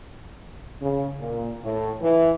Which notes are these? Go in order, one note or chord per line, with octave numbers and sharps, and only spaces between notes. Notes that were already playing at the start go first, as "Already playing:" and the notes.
C#3
A#2
A2
E3